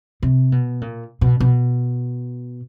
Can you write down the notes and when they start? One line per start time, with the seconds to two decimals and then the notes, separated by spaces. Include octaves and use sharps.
0.22 C3
0.52 B2
0.81 A#2
1.21 B2
1.40 B2